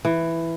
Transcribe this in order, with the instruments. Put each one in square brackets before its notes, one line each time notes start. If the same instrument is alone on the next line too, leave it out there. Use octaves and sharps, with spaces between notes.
[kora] E3